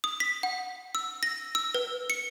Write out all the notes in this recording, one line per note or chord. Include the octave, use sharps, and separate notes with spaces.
D#6
B6
F#5
E6
A#6
E6
B4
C#7